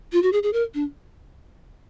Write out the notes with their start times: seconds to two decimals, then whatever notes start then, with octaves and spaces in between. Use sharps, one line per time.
0.13 F4
0.23 F#4
0.33 G#4
0.43 G#4
0.53 A#4
0.74 D4